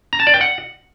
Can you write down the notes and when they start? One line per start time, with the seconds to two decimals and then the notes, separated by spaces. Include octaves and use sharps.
0.13 A#5
0.20 A5
0.27 D5
0.34 G5
0.41 F#5